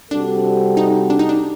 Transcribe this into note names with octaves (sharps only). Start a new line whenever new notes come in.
C3 G3 C4 D4 F#4 A4
D#4
D4
D#4
D4